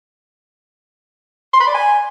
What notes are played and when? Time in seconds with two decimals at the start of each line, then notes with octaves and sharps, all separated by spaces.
1.53 C6
1.60 B5
1.67 D5
1.74 G#5